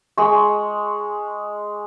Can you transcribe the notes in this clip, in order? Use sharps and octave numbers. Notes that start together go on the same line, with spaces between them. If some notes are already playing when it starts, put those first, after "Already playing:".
G#3 C#6